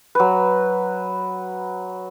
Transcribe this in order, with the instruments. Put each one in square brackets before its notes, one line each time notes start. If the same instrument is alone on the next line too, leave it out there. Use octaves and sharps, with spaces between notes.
[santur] F#3 B4